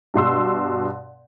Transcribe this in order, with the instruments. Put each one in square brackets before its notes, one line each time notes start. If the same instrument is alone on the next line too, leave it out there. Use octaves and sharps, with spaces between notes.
[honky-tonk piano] G2 B2 C6 E6